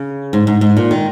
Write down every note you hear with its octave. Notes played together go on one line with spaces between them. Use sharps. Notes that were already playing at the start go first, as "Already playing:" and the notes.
Already playing: C#3
G#2
G#2
G#2
A#2
D#3